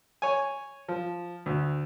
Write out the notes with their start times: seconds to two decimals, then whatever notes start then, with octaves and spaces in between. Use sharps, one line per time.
0.22 C#5 G#5
0.88 F3
1.46 D2